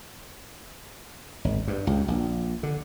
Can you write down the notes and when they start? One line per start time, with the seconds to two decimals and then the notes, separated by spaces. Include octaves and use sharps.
1.45 G#1
1.67 G2
1.87 C#2
2.08 A#1
2.63 D3